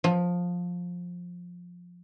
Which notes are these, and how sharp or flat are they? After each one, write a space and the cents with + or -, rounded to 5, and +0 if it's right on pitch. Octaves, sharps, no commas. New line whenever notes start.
F3 +15